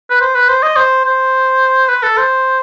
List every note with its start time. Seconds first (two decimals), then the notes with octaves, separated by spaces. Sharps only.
0.10 B4
0.21 C5
0.35 B4
0.49 C5
0.63 D#5
0.76 C5
1.05 C5
1.89 B4
2.03 A4
2.17 C5